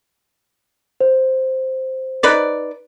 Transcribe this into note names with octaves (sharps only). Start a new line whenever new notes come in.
C5
D#4 B4 D5